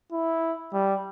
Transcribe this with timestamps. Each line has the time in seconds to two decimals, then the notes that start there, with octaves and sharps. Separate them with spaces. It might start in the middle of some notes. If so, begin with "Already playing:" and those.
0.12 E4
0.73 G3